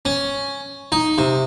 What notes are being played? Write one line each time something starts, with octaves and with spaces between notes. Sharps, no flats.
C#4
D#4
C3